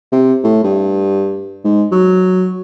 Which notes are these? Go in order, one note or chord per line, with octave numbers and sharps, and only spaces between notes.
C3
A2
G2
G#2
F#3